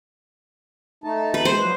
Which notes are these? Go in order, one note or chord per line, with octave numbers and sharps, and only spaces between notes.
A3 D#4 A5
B4
G#3 C5
F3 F#3 B4